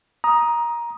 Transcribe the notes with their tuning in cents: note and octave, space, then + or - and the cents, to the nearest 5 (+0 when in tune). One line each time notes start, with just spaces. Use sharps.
A#5 +15 D#6 +0